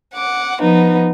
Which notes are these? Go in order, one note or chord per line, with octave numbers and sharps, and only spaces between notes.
F#5 D6
F3 B3 D#4